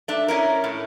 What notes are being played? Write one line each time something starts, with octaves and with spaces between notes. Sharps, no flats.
A3 D4
C#4 E4 A#4
A2